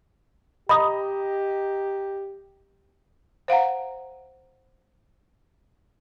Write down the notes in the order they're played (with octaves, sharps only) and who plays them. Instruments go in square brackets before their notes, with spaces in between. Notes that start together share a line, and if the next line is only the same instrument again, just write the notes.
[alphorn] G4 [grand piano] D#5 A#5 [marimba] B5 D#6
[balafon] C5 F5 F#5 A#5